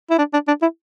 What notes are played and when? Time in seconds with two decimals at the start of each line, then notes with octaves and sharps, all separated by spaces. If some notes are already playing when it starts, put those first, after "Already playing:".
0.10 E4
0.19 D4
0.33 D4
0.48 D4
0.62 E4